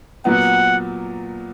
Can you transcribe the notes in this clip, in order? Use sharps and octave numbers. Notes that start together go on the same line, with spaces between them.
A#2 F#3 B3 F#5